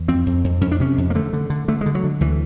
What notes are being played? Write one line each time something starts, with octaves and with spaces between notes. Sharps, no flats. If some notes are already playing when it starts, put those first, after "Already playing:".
Already playing: E2
F2 C4
F2
F2
F2 C#4
D4
C3 C#4
F2
A#3
D3 A3
D3
D3
D3 A3
D3 G#3
F#3
D3
D2 E3